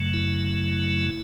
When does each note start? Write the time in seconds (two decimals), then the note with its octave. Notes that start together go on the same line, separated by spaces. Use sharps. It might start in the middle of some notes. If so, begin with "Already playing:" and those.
Already playing: F#2 C#3 F#3 A3
0.14 E4